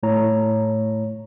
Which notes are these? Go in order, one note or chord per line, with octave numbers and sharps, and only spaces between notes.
A2 A3 E4 C#5 A#5